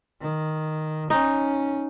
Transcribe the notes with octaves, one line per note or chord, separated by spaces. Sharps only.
D#3
C#4 D#4